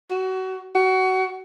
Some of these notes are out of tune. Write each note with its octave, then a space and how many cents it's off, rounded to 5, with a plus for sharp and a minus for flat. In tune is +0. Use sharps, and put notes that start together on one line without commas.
F#4 +25
F#4 +20